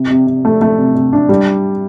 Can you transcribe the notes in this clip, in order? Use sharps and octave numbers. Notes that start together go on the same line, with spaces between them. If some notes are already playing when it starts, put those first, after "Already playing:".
Already playing: C3
C3
C3
A3
A3
C3
C3
D4
G3